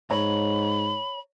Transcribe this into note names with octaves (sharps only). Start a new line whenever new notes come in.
G#2 C#5 A#5 B5